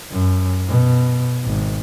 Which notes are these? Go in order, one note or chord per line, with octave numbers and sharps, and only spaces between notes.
F#2
B2
G#1